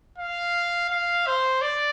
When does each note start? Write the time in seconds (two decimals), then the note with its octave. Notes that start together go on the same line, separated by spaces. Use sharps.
0.18 F5
0.90 F5
1.27 C5
1.62 D5